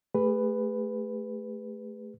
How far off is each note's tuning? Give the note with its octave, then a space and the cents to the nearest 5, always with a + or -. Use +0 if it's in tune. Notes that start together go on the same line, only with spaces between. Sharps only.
A3 +0 G#4 -45 B4 +5